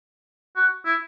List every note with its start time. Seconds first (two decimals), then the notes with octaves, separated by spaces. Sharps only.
0.56 F#4
0.85 E4